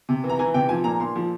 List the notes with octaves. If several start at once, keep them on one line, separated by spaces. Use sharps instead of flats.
C3
E3
A#5
E3 G#5
C3 G5
F3 G#5
A#2 A#5
A#2 C6
F3